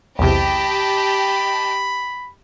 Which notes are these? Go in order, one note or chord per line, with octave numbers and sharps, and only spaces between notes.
B1 E2 C3 G4 D#5 A5 B5